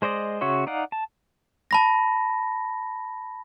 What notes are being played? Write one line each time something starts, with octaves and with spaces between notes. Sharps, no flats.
G#3 C5 D5 D#5
C#3 F#4 C#5 E5 C6
D#4 D5 F5 F#5
A5
A5 B5 A#6